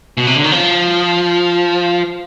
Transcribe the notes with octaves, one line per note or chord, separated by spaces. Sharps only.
B2
C3
D3
D#3
F3